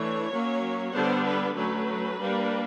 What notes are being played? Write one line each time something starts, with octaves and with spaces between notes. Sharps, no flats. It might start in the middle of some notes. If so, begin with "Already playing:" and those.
Already playing: E3 A3 D4 C#5
F#3 A#3 C#4
D3 G3 B3 D4 C5
B4
F#3 A3 C#4 B4
G3 A#3 D4